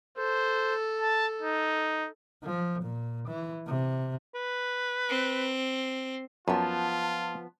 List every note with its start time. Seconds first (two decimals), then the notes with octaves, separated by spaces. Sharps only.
0.18 A4 C5
1.01 A5
1.42 D#4
2.44 F3
2.82 A#2
3.28 E3
3.67 C3
4.35 B4
5.10 C4
6.48 F#2 F3 B3 F4 A5